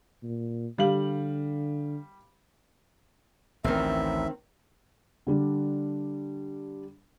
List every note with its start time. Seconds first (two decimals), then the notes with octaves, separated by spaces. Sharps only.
0.23 A#2
0.78 D3 G3 F5 F#7
3.64 A1 D2 D#3 C4 E5
5.27 D3 G3 D4